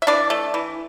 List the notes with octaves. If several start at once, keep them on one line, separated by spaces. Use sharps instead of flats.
E5
E3 D4 D5
A3
E3